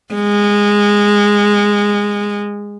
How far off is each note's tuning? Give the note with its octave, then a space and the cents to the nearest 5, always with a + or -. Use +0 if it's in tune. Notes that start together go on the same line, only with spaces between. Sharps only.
G#3 -15